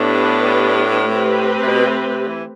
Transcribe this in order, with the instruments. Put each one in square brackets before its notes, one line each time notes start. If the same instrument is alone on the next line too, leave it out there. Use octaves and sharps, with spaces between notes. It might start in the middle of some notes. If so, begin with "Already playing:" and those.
Already playing: [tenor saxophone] A2 [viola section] B3 D4 G4 B4
[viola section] A3 C4 G4 B4
[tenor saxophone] C3
B2
C3
C3
E3